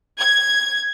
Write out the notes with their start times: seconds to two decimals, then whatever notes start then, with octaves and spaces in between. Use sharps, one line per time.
0.19 G#6